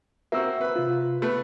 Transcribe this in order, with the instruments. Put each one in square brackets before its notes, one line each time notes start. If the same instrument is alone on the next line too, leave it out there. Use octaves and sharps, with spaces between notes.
[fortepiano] A#3 C4 F#4 [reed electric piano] E5 E6
[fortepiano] B4 B5
[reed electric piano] C3 F4
[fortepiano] A3 B3 B4